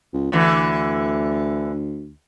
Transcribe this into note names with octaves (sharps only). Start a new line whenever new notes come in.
C#2
D2 D3 E3